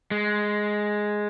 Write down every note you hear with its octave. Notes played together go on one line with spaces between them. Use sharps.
G#3